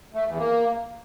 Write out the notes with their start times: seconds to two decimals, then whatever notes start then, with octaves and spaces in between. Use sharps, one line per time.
0.14 A3
0.26 E2
0.38 A#3